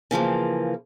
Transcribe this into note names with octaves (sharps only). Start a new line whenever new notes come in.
C#3 E3 F3 A#3